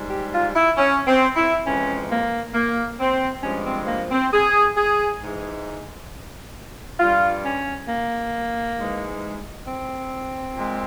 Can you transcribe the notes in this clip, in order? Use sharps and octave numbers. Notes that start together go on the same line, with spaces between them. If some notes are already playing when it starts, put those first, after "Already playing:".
Already playing: G#2 G3
G4
F4
E4
C#4
C4
E4
F2 E3 G#3 C#4
A#3
A#3
C4
G2 F3 G#3 C#4
C4
A#3
C4
G#4
G#4
G#2 E3 G#3
G2 G3 F4
C#4
A#3
G#2 E3 G#3
C4
A#2 G#3